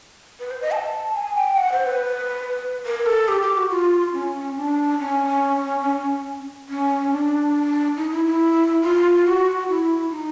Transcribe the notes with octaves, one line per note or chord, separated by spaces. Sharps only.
B4
C5
D#5
A5
G#5
G5
F#5
C5
B4
A#4
A4
G4
G4
F#4
F4
C#4
D4
C#4
C#4
D4
D#4
E4
E4
F4
F#4
E4
D#4